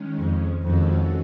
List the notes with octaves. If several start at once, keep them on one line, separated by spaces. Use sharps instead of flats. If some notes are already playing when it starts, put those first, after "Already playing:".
Already playing: D#3 G#3 C#4
F2
F2 D#3 G#3 C#4 F#4 A4